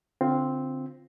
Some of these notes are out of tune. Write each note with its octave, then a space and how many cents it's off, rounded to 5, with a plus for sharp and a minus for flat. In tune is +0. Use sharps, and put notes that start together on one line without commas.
D3 -20 C4 +0 F4 +0